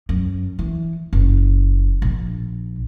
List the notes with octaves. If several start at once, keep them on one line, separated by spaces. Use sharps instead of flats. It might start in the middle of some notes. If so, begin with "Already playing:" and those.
F#2
E3
F#1
A#1